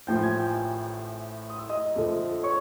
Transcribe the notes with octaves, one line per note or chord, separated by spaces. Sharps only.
A1 A2 F3 G5 G6
G#5 G#6
G5 G6
G5 G6
D#6
E6
D#5 D#6
F2 D3 F3 A3
C#5 C#6